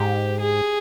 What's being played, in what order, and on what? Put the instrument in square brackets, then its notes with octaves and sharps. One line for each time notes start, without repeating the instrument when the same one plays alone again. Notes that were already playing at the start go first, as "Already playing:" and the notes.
Already playing: [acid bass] G#2 [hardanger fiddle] G4
[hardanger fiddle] G#4